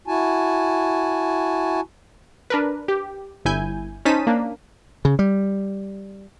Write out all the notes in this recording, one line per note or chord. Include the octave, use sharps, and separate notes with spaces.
E4 F#4 G#5 A5
D4 A#4 B4
G4
G1 E4 G#5 G6
C#4 D#4 C5 A5 B6 D#7
A#3 D4
C#3
G3